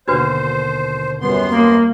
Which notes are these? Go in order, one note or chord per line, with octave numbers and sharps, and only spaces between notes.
D#2 B2 D3 D4 F#4 B4 C5
F#2 G3 B3 C4 C6
A#3